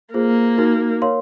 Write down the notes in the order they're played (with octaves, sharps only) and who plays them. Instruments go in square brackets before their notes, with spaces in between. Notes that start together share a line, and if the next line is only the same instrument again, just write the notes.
[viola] A#3 [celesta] F4 G#4 C5
[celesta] D#4 F#4 A#4
A#4 C#5 F5 C6